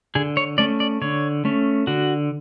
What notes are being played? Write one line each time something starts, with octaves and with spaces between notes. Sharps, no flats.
D3 G#4
C#5
A3 C#4 D5
D5
D3 C#5
A3 C#4
D3 F#4